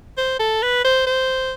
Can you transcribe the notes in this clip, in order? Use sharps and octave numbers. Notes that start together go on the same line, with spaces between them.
C5
A4
B4
C5
C5